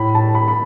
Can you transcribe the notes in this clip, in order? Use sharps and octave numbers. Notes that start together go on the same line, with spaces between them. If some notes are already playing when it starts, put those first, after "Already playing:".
Already playing: A2 B5
A5
B5
B5